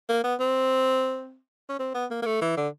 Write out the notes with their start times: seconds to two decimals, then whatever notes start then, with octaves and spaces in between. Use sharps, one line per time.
0.09 A#3
0.24 B3
0.40 C4
1.69 C#4
1.79 C4
1.95 B3
2.11 A#3
2.22 A#3
2.26 A3
2.42 E3
2.57 D3